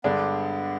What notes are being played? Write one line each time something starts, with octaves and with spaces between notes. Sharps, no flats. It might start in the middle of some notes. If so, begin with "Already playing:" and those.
G2 D3 G#3 B3 D4